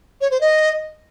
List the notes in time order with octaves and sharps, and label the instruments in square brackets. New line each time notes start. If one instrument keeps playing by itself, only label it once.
[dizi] C#5
C5
D#5